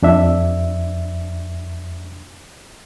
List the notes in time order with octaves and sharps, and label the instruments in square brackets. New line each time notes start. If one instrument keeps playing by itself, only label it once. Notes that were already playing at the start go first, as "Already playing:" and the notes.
[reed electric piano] F2 D4 E5